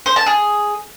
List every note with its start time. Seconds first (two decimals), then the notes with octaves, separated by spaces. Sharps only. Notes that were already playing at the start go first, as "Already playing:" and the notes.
0.06 C5
0.16 A5
0.26 G#4